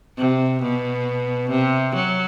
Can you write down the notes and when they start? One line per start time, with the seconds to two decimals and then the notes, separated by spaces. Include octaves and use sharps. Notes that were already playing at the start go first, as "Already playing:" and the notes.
0.18 C3
0.62 B2
1.50 C3
1.95 F#3